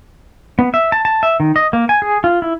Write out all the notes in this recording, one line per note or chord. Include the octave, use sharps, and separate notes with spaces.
B3
E5
A5
A5
E5
D#3
D#5
A#3
G#5
G#4
F4
E4